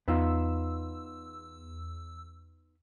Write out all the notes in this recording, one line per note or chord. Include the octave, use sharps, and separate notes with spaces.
E2 B3 D#4 F4 E6